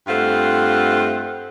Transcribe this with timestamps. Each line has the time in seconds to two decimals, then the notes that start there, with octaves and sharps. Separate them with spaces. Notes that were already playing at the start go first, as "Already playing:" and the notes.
0.07 G2 A3 C4 F4 F#5